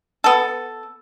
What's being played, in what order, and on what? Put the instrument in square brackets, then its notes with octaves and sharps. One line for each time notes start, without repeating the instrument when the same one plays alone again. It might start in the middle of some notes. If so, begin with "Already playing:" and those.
[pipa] B3 A4